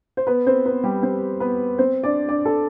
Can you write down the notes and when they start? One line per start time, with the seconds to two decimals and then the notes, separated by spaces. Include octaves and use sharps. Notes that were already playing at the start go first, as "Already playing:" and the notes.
0.17 C5
0.27 B3 B4
0.47 C4 C5
0.65 B3 B4
0.84 G3 G4
1.02 C4 C5
1.40 B3 B4
1.78 C4 C5
2.04 D4 D5
2.29 D4 D5
2.45 A4